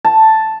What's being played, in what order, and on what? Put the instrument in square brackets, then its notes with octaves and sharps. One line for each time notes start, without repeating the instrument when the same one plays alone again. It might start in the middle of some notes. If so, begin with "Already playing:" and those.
[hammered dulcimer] A5